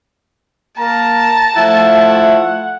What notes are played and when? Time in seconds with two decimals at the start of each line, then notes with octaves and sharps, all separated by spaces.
0.78 A#3 A5 A#5
1.57 F3 A3 E4 F#5